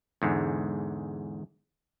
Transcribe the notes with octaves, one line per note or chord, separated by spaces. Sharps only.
E2 G#2 D3